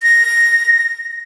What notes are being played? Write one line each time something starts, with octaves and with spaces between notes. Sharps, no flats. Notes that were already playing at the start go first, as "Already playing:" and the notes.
A#6